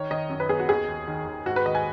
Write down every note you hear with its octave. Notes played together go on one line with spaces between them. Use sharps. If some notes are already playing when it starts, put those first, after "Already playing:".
Already playing: D#3 C#5
D#3 D#5
F#2
B4
B3 G#4
F#4
D#2 G#4
D#2
D#3
D#2
G#2 F#4
B4
D#3 D#5
G#5